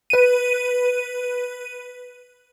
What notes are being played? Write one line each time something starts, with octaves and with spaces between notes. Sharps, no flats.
B4 D#7